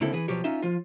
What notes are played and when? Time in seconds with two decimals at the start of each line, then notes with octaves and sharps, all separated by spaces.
0.01 C#2 D3 A#3 C4 E4 A4
0.13 E3 G#4 B4
0.28 B2 F3 F#3 G4 C#5
0.44 C#4 D#4 F4 E5 C6
0.62 F3 F4